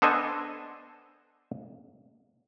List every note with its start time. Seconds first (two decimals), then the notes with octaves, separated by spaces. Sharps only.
0.02 B3 D4 A4 C5 D#5 G#5